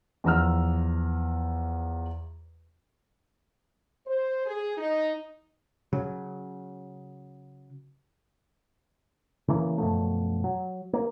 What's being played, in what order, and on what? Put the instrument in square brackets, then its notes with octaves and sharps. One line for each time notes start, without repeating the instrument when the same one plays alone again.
[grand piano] E2 F3 A#5 E6 F6
[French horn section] C5
G#4
D#4
[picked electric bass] C#3 F#3
C#3 E3 A#3
F#2 B2 F3 A3
F#3
A#3